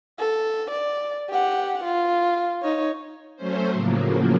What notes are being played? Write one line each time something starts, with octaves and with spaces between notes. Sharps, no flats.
A4
D5
G4 F#5
F4
D#4 C#5
F#3 A3 C#4 C5
A2 C#3 F3 F#3 A#3